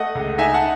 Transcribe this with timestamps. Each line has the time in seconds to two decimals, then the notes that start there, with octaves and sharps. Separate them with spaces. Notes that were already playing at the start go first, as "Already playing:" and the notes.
Already playing: A3 D#5 F#5
0.15 C#2
0.38 D#4 E5 G#5
0.54 F#5 A5